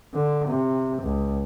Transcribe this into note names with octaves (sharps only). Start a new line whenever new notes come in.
D3
C3
C#2